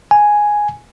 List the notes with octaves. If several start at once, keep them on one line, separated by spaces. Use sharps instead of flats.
G#5